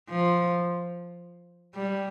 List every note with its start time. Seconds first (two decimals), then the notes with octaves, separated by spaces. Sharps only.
0.09 F3
1.76 G3